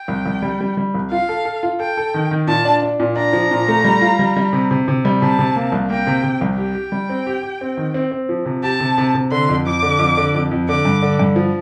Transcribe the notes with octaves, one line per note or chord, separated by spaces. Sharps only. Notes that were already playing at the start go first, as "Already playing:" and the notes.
Already playing: G5
C2
C2
G3
G3
G3
C2
F4 F5
A4
A4
F4
A4 G5
A4
D#3
D#3
A#2 A5
D4
D4
A#2
D4 A#5
F3
A#2
A3
G3
F4
G3
G3
C3
C3
C3
G3
C3 A5
C3
A#3
C2
A#3 G5
C3
C3
C2
G4 G5
G4
G3
C4
G4
G4
C4
D#3
C4
C4
F3
C3
G4 A5
C3
C3
C3
D3 C6
F2
F2 D6
D3
F2
D3
F2
F2
D3 D6
G2
D3
G2
F3